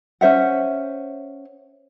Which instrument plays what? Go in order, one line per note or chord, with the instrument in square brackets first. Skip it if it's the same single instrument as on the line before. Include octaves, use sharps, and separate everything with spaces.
[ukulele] C#4 C5 E5 F#5